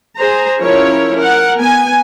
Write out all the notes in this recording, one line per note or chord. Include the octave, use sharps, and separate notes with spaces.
G#4 C5 A#5
F3 C#4 E4 A#4 C#5
A#4 F#5
B3 G#5